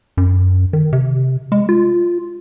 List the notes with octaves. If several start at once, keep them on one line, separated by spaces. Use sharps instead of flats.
F#2
D#3
C3
G#3
F4